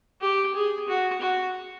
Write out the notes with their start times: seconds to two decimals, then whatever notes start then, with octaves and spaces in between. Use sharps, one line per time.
0.21 G4
0.55 G#4
0.88 F#4
1.21 F#4